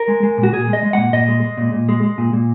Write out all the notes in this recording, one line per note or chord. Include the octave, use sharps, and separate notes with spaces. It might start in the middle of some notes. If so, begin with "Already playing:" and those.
Already playing: A#4
G#3
G#3
A#2
F#4
A#2 G#4
G#3
D#5
G#3
A#2 F#5
A#2 D#5
G#3
G#3
A#2
A#2
G#3
G#3
A#2
A#2